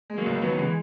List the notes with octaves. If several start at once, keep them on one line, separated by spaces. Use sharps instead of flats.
G#3
F#3 A#3
C#2
D#3 F#3 B3
C#3 E3 G#3